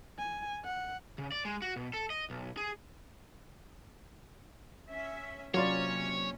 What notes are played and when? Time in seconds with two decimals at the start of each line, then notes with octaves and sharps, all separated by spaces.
0.19 G#5
0.65 F#5
1.18 C#3
1.32 D5
1.45 G#3
1.62 F#4
1.76 B2
1.93 A4
2.10 D#5
2.30 B1
2.57 G#4
4.89 C#4 E5
5.54 C3 F#3 A#3 C#4 F4 C#5 D5